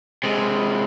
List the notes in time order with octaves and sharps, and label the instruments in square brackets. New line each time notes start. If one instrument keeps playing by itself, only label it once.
[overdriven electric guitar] C3 G#3